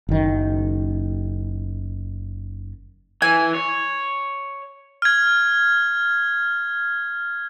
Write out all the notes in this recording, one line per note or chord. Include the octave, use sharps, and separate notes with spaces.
F#1 D#3
E3 G#5
C#5
F6 G#6